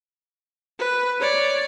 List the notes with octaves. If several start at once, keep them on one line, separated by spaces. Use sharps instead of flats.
B4
C#5 D5